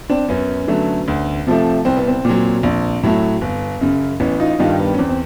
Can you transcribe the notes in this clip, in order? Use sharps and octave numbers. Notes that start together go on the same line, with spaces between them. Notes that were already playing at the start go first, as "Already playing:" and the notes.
C4 D4
F#2 B3 C#4
D3 F#3 A3
D2
C3 F3 A3
C2 C4
B3
C4
A#2 F#3
A#1
A2 F#3 A3
G1
F#2 C#3
A1 B3 C#4
D#4 F4
G2 D#3 G3 D#4 F4
B3
C#4
E2 C4
C4